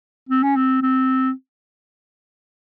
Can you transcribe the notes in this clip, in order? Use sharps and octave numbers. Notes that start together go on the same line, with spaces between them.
C4
C#4
C4
C4